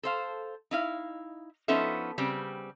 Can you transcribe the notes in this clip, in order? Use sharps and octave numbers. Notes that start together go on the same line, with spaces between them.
A4 C5 F5
D#4 E4 F5
F3 B3 C#4 D#4 A4 E5
C#3 G3 C4